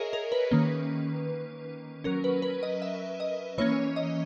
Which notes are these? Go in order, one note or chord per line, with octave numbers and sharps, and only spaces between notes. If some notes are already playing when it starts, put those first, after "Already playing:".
Already playing: G#4 A#4 C#5 D#5 E5
A#4
B4
D#3 A#3 C#4
F#3 C#4 A#4
B4
B4
D#5
E5
D#5
E3 A#3 C#4 C#5
D#5